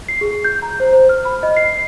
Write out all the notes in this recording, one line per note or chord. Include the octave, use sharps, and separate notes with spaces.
C7
G#4
G6
A#5
C5
C5
F6
B5
D#5
C7